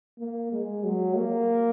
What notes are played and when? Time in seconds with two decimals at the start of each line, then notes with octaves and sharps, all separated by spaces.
0.19 A#3
0.52 G#3
0.84 F#3
1.15 A#3